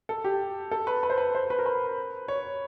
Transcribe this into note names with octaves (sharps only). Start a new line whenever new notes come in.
A4
G4
A4
B4
B4
C5
B4
C5
B4
A#4
B4
C#5